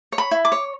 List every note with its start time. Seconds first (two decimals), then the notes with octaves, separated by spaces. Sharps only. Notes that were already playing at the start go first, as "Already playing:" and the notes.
0.12 C#5
0.18 B5
0.31 E4
0.45 D6
0.52 C#5